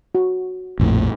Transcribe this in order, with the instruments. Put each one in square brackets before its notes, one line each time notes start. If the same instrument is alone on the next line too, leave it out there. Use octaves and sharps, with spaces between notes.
[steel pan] F#4
[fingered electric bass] A#1 F2 A2